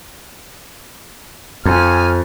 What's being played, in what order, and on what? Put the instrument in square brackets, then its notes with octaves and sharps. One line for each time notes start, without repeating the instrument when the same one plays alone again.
[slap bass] F2 [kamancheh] G#5 F6